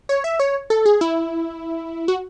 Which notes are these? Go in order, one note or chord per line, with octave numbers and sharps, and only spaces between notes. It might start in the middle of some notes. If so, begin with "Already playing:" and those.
C#5
E5
C#5
A4
G#4
E4
F#4